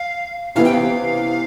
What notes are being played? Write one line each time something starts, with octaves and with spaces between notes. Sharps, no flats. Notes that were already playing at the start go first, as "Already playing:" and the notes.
Already playing: F5
C3 E3 B3 E4 F5
G5
F5